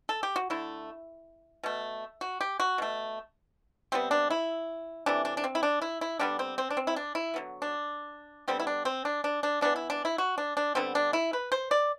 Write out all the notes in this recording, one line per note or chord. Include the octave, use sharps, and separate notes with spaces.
A4
G4
F#4
D3 A3 E4
B2 A3
F#4
G4
F#4
B2 A3
C3 G3 B3 C4
D4
E4
C3 E3 A3 D4
D4
D4
C4
E4
D4
E4
E4
D3 G3 B3 D4
C4
C4
D4
C4
E4
D4
E4
D3 F#3 B3
D4
D3 G3 B3 C4
E4
D4
C4
D4
D4
D4
E3 B3 D4
E4
D4
E4
F#4
D4
D4
D3 G3 B3 C4
D4
E4
B4
C5
D5